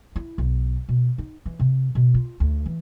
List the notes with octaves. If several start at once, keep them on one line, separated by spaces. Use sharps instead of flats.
E4
B1
B2
D#4
E3
C3
B2
F4
D2
E3